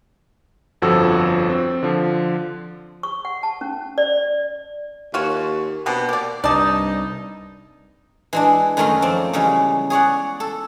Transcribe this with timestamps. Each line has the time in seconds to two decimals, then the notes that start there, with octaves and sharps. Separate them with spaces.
0.82 G1 F2 F3 F#4 A4 E6
1.50 C4
1.83 D3 F3
3.03 C#6
3.25 F#5
3.43 A5
3.61 C#4
3.98 D5
5.14 D#2 F4 F#4 C#5
5.86 B2 B3 C4 D4
6.09 A#3 G4 D5
6.44 C2 G2 D#4 D5 A5
8.33 E3 G#3 D4
8.77 F#2 D#3 F#3 A3 A#4 C6
9.02 F3 C4 D5
9.33 E2 C#3 G3 G#3
9.90 G#4 C#5 D5 F#5
10.40 A4